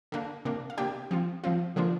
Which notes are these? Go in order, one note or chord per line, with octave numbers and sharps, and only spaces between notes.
D3 A#3 D4
C3 A#3 D4
F5
C3 A#3 D4 G4 G5
F3 C4 F4
F3 C4 F4 F5
D3 F3 A#3 D4 F4